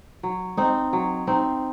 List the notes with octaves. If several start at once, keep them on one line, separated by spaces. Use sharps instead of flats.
F#3
C4 D#4
F#3
C4 D#4